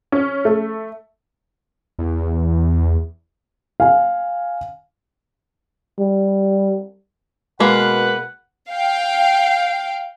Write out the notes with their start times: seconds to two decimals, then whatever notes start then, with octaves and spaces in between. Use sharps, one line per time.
0.12 C#4
0.45 A3
1.99 E2
3.80 F5 G#5
5.99 G3
7.60 B2 G#3 A#3 B4 F#5
8.69 F5 G5